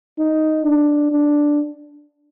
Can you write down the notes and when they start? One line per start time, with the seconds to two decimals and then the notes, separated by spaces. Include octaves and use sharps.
0.18 D#4
0.65 D4
1.11 D4